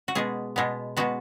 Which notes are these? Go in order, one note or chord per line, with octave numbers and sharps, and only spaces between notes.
F#4
B2 G#3 B3 G#4
B2 G#3 B3
B2 G#3 B3 F#4